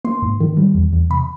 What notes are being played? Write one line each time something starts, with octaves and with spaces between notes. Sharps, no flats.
A#3 C6
G#2
D#3
G3
E2
E2
C3 B5